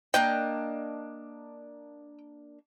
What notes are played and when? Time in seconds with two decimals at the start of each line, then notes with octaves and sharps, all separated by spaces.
0.14 A#3 D4 D#5 G5